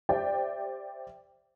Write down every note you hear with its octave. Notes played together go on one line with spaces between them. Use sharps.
G4 C5 D5 E5 G5